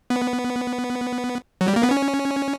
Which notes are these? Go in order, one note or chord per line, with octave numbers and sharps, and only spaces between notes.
B3
F#3
G3
A#3
B3
C#4